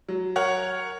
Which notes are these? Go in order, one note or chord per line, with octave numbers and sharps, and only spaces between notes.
F#3
A#4 C#5 F#5